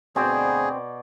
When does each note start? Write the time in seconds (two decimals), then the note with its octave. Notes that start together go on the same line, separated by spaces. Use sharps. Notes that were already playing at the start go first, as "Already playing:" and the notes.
0.16 D2 B2 B3 C4 G#4 C5 D5